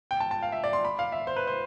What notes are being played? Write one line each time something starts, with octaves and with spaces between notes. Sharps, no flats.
G5
A5
A5
F5
E5
D5
C6
B5
F5
E5
C5
B4
C5